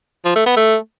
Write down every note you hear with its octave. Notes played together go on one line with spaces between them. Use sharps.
F3
A3
B3
A3